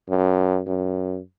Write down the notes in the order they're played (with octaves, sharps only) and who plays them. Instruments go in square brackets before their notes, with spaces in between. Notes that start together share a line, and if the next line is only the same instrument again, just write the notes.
[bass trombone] F#2
F#2